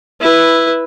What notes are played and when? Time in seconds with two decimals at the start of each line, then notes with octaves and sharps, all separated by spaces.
0.21 E4 B4